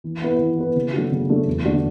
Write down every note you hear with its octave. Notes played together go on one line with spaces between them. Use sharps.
E3
B3 E4 B4
E3
B3 E4 B4
C#3
F#3 A3 D4 F#4
C#3
F#3 A3 D4 F#4
E2
D3 A3 D4 F#4